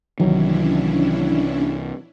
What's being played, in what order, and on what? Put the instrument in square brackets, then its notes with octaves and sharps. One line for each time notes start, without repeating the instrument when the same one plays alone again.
[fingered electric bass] C2 E3 [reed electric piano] D#3 F#3 [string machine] C#4 D4 E4